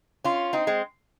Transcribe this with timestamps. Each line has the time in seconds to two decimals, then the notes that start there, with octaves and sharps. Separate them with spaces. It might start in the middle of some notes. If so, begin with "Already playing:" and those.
0.24 C#4 F4
0.53 C4 D#4
0.67 G#3 C4